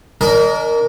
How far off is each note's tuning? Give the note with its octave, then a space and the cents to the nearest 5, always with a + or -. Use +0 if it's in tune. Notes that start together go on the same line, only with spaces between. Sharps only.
D4 -40 A#4 +0 D#5 +0